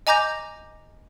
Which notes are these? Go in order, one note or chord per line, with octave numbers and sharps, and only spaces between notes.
D#5 G#5 A#5 D6 G6 A#6